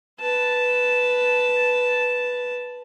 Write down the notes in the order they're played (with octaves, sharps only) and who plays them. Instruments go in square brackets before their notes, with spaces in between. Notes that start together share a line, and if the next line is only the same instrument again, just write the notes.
[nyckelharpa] B4 A5